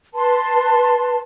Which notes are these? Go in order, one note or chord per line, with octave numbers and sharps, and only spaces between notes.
B4 A5 C6